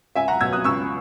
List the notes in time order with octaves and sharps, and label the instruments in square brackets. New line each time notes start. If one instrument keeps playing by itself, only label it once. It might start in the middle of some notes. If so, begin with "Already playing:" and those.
[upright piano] C#2 E5 G#5
F#5 A#5
B2 F#3 E6 G#6
D#6 F#6
C#2 C#6 E6